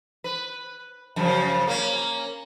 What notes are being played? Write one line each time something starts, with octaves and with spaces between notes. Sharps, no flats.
B4
F#2 C#3 F3
A#3 C#4